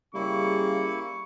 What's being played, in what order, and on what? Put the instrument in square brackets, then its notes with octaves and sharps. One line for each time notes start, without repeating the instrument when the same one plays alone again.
[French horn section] C#3 G3 [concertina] A#3 E4 [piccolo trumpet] C#6